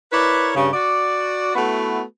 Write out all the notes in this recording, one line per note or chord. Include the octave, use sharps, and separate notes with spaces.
E4 A#4 B4 C#5 D5
G2 C#3
F#4 D5
A3 B3 E4 F#4 B4